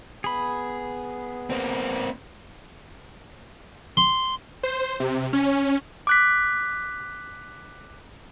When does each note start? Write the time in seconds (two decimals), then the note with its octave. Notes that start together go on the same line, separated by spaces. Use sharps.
0.24 B3 G#4 B5
1.50 A#3 C4
3.97 C6
4.63 C5
5.00 C3
5.33 C#4
6.07 D6 F#6 B6